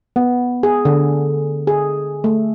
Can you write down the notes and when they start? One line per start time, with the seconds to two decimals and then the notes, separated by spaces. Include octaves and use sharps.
0.16 B3
0.63 G#4
0.85 D3
1.67 G#4
2.24 A3